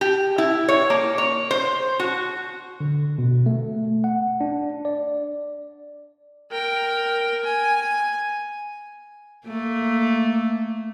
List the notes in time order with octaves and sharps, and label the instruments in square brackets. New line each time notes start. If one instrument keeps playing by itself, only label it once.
[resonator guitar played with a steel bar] G4
E4
C#5
A#3
C#5
C5
F#4
[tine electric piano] D3
B2
A3
F#5
D4
D5
[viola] A#4 G5
G#5
[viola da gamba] A3 A#3